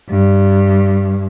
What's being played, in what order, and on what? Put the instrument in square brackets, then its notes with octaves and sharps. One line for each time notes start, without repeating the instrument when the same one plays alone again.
[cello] G2